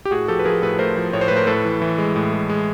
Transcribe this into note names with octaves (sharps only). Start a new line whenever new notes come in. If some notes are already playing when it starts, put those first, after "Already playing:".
G4
A2 F#4 G#4
F3 G4 A4
B4
F3 G#4 A#4
A2 A4 B4
A3 A#4 C5
F3
A2 C#5
C5
B4
A2
A#4 C5
A2 A4 B4
E3
E3
G#3
A2
G#3
G#3